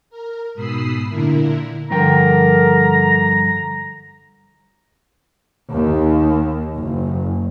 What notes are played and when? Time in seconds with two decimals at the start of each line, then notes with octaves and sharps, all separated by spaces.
0.10 A#4
0.54 G#2 B2 B5 D#6 E6 C7
1.08 A#2 D3 E4 A#4
1.90 G2 D3 F3 A#4 G5 A#5
5.72 D#2
6.75 F#1